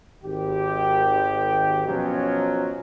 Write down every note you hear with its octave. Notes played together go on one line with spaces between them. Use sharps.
G#1 D#3 G4
B2 F3 F#3 C#4